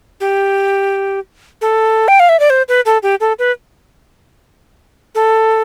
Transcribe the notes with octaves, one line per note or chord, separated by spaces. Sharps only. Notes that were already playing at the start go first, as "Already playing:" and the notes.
G4
A4
G5
F5
E5
D5
C5
B4
A4
G4
A4
B4
A4